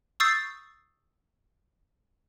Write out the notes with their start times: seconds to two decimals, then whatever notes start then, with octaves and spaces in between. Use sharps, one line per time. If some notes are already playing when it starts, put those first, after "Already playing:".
0.20 C#6 D#6 E6 G6 A6 C7